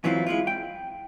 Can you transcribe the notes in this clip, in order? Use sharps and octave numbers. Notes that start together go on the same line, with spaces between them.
G#2 E3 F#3 C4 E4 F4
G#3 E4 F4
G5